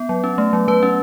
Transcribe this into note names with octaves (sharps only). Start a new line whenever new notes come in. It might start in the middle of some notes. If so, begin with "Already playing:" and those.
Already playing: B3
F#3
C#4
A3
F#3
F#3 B4
C#4